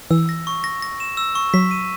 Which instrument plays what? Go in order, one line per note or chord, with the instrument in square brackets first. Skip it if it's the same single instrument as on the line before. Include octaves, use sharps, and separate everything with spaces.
[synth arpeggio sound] E3 [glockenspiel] E6
[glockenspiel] A#6
C#6
A#6
A#6
E7
E6
C#6
[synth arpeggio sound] F#3 [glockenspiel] B6
[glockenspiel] D#7